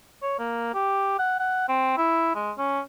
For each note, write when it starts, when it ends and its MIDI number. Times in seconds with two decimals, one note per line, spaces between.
0.22 0.37 73
0.39 0.69 58
0.74 1.19 67
1.19 1.40 78
1.40 1.66 78
1.68 1.95 60
1.97 2.35 64
2.35 2.51 56
2.58 2.80 61